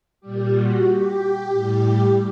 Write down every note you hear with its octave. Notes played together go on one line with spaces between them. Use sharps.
A#2 G3 G4
F#4
G4
A2 G3